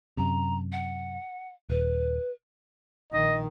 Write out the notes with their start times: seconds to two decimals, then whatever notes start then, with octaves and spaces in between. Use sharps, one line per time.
0.17 F#2 C3 A#5
0.72 F#5
1.70 D#1 B4
3.13 A#1 D#3 D#5